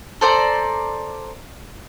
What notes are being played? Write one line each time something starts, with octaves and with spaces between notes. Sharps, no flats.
A4 C5 D5 A#5